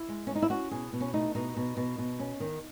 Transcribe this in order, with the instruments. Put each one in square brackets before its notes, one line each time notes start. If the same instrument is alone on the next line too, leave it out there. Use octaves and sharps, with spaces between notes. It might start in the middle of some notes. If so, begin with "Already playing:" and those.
Already playing: [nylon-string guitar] E4
G#3
G#3 C#4
D#4
E4
C#4 F#4
B2 G#4
B2
C#4
A3 D#4
B2 D#4
B2
B2
B2
C#4
D#3